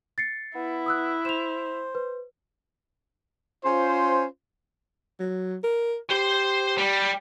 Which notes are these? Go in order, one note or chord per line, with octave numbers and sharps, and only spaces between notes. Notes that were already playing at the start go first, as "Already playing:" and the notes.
A6 C7 C#7
B3 E4
D#6 E6 F#6
C5 E7 F7
B4
C#4 F4 C5
F#3
A#4
G4 C5 C6
G3